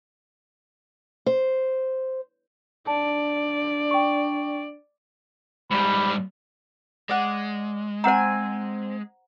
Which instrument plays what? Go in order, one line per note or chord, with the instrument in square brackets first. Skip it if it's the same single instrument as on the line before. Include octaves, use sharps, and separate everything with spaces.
[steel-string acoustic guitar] C5
[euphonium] D4 [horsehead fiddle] D5 [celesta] A5
[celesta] G5 C#6
[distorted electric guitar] G#2 G3 [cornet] B5
[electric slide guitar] G#3 [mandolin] D5 F#5
[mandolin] C4 G#5 [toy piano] C5 F#5 A#5